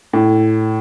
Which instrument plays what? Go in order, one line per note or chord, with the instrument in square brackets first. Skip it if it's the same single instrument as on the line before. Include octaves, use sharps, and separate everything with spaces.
[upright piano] A2